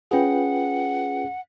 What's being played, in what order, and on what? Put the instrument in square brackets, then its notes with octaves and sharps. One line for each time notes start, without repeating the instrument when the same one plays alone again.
[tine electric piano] C#4 G#4 [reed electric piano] F4 B4 G5 [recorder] F#5